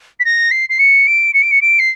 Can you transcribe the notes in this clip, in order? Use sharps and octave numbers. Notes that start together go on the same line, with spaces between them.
B6
A#6
C7
C7
C#7
D7
C#7
D7
C#7
D7
C7